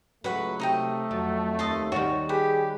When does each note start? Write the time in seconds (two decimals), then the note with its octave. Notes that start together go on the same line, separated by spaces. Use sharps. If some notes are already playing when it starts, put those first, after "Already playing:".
0.24 C#2 F#3 G#3 A3 B4 F#5 C#6
0.60 C3 A3 D#4 D#5 G5
1.11 F2 F#3
1.59 D#2 D#5 A5 C6
1.92 D#3 G3 F#4 C#5
2.29 G4 G#4 B4